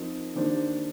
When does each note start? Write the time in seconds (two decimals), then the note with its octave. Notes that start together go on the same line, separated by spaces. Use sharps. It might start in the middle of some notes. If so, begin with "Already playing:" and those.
Already playing: F3 C4 D#4 A#4
0.35 D#3 A#3 D4 G4 C5